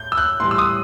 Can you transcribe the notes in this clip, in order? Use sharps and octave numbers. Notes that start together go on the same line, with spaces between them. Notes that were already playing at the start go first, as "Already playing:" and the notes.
Already playing: A2 G6
E6
F#6
A2 E3 G3 C6
E6
D#6